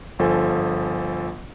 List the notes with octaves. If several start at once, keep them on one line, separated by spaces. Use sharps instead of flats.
G1 F3 A4 G#5